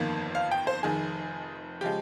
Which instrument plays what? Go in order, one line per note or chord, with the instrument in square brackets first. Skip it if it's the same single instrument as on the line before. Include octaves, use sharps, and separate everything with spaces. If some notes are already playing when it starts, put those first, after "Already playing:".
Already playing: [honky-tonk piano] G1 F2 D#3 A#3
F5
G5
C5
F1 F2 D#3 G#4
C#3 F3 G#3 G4